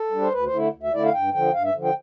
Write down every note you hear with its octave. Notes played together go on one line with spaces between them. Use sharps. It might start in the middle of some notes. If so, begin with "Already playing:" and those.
Already playing: A4
G3 D4
C5
D2 B4
C5
D3 A3 E4
D2
E5
D3 A3 E4 D5
F5
G2 G5
D3 F3 G5
G2 F5
E5
D3 F3
G5